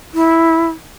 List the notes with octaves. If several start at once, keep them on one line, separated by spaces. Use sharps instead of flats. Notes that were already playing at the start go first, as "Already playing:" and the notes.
E4